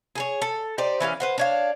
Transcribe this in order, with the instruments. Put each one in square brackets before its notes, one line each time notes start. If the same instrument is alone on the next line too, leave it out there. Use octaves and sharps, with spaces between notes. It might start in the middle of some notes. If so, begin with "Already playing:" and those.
[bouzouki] G#4 A4 C#5
A4
D#4 G4 C5 D5
E3 C#4 G4 F5
B4 C5 F#5
D4 C#5 F5